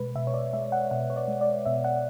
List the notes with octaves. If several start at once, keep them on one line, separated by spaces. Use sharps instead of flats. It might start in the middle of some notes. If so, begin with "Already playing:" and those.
Already playing: B2 G#3 B4
B2 E5
C#5
D5
G#3 E5
F#5
B2 F#5
C#5
D5
G#3
D5
B2 E5
F#5